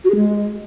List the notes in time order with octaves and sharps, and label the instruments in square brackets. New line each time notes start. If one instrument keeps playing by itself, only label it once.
[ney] F#4
G#4
G#3